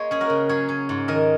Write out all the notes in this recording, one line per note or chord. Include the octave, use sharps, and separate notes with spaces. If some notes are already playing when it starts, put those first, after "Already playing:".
Already playing: G#3 A#3 C#5
C#4 G#4
F#4 A#4
C#3
F#3 G#4 C#5
C#4
G#2
D#3 A#4 D#5